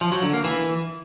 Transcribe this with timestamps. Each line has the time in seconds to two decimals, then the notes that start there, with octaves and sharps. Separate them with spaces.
0.01 F3
0.12 F#3
0.23 D3
0.33 A#3
0.44 E3